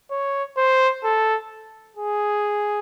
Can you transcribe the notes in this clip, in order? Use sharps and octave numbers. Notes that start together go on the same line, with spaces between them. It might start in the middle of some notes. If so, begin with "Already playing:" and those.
C#5
C5
A4
G#4